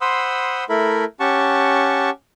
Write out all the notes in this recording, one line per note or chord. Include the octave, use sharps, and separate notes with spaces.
C5 F#5 B5 C6 D#6 E6
A3 E4 A4 A#4 B5
C#4 G4 F#5 A5 C#6